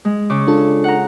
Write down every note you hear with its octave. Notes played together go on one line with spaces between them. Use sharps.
G#3
C#3 D6
D4 F4 A4
F#5 A#5